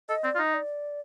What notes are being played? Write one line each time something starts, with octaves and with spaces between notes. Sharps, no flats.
A4 D#5
C4 D5
F4
D#4 D#5
D5